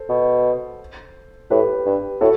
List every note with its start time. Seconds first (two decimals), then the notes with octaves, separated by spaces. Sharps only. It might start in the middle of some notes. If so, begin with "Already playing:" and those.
Already playing: A4 C5
0.09 B2
1.50 A2 G4 B4
1.85 G2
2.21 A2 F#4 A4